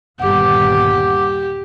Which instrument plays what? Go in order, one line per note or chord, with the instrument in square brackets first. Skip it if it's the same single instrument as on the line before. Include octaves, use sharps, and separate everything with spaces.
[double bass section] G1 D#2 A#2 [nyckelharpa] G4 [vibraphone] F#5 D6